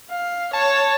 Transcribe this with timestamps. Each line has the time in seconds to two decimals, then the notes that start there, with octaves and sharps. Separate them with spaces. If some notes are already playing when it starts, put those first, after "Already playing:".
0.10 F5
0.53 C#5 A5